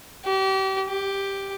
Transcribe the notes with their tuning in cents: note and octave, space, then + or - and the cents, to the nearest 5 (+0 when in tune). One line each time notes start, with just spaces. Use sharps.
G4 -35
G4 +5